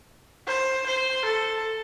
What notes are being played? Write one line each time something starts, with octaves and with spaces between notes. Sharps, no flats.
C5
C5
A4